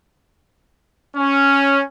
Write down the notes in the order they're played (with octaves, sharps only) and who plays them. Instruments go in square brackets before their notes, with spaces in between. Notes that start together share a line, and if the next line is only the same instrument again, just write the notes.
[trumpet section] C#4